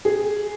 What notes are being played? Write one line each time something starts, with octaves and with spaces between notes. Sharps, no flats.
G#4